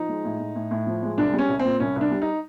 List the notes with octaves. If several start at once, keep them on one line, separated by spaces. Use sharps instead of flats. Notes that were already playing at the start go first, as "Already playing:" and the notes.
Already playing: F3 D#4
G#3
A2
A2
A2
A2
F3
G#3
C2 D4
G3
C#4
C2
C4
A#2
C2 C#4
C2
D4
G3
D#4